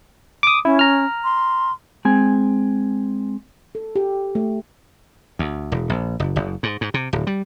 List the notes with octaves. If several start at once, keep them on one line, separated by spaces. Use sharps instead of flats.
D6 D#6
C#4 E4
A#5 F6
C6
G#3 C4 G#5
A4
G4
A3
D2
E1
A#1
F#1
F#1
G#2
G#2
C3
D1
G3